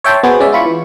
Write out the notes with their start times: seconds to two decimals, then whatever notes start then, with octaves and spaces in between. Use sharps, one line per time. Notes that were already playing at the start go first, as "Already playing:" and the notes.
0.04 C#5 E5 G5 A5 C6
0.23 B3 F#4 G#4 C5 F#5 G#5
0.40 G#3 C#4 D5 E5
0.53 E4 F4 B5 C#6
0.66 E3